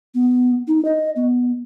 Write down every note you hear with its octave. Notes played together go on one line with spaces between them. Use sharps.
B3
D#4
D#5
B3